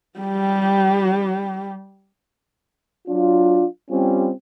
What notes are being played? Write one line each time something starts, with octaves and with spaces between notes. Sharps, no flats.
G3 G4
F#3 D4 F4
G3 C4 C#4 F4 G4